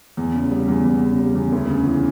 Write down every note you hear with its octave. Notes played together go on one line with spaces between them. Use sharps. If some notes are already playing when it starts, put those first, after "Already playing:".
E2
C#3
G3
E2
E2
C#3
G3
E2
D2
C#3
E3